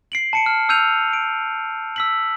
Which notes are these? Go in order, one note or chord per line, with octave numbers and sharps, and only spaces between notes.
C7 D7 F#7
A5 C#7 D7
F6
E6 F6 G6 D#7 F7
D7
E6 B6 F#7